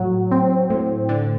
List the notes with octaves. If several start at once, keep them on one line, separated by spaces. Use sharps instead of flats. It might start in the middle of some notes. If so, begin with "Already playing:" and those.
Already playing: A2 F#3
C4
A2
D3